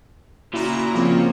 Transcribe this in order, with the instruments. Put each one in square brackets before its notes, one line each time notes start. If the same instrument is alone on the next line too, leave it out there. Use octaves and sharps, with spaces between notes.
[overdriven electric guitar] A#2 [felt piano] C#3 [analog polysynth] E4 F#4 A#5
[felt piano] C#3 F4 [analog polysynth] F3 C#5 [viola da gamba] A#3 C4